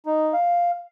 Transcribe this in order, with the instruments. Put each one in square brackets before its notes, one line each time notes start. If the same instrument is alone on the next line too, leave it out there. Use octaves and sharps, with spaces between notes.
[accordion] D#4
F5